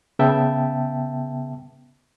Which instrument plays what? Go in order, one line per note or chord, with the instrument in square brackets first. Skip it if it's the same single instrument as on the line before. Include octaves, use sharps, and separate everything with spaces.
[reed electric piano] C#3 B3 E5 G5 A5